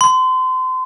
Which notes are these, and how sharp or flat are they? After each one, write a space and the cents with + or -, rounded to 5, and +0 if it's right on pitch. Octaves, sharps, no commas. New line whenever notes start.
C6 -30